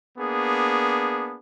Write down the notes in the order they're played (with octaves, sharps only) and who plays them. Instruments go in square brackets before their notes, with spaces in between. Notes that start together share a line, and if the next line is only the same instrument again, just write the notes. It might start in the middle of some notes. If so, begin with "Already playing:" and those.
[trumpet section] A#3 B3 D4 G#4